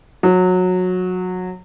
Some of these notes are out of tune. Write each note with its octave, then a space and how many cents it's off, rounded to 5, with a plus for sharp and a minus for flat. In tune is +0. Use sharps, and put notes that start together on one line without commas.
F#3 -20